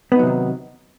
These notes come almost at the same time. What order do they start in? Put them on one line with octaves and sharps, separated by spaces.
B3 D#4 F#3 C3 D#3